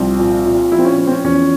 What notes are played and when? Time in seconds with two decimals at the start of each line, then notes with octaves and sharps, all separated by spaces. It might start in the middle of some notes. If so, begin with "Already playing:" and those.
Already playing: C2 F3 C4
0.19 A#2
0.45 A#2
0.71 F3 E4
0.78 C4
0.85 C#4
0.98 F3 C#4
1.07 C4
1.12 C#4
1.24 E2 C#4